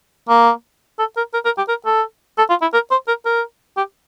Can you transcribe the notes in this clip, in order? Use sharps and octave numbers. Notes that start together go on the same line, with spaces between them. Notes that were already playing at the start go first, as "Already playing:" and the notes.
A#3
A4
A#4
A#4
A#4
G4
A#4
A4
A4
F4
E4
A#4
C5
A#4
A#4
G4